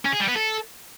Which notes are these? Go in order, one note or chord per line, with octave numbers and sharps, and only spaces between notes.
C#4
G#4
G3
B3
A4